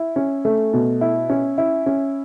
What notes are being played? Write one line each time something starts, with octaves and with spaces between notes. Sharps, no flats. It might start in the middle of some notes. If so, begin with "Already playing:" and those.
Already playing: E4
C#4
A3
B2
E4
C#4
E4
C#4